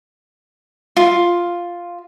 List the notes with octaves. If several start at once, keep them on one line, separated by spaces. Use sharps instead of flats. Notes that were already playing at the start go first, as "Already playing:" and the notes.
F4